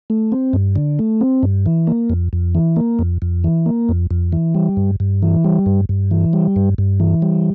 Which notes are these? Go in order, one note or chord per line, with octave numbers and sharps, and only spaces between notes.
A3
C4
G2
D3
A3
C4
G2
E3
A#3
F2
F2
E3
A#3
F2
F2
E3
A#3
F2
F2
E3
G3
G2
G2
E3
G3
G2
G2
E3
G3
G2
G2
E3
G3